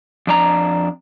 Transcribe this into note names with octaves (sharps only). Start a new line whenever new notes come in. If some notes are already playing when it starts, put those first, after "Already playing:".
F2 D4 A#5